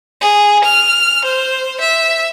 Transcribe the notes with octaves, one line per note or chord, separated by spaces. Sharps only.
G#4
F6
C5
E5